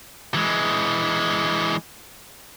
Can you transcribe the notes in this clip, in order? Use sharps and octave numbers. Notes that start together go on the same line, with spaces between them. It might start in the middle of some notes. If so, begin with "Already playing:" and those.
E3 G#3